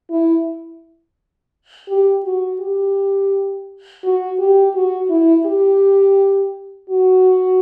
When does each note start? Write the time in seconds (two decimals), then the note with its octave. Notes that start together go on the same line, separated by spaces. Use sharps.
0.11 E4
1.89 G4
2.25 F#4
2.61 G4
4.04 F#4
4.39 G4
4.75 F#4
5.10 E4
5.46 G4
6.90 F#4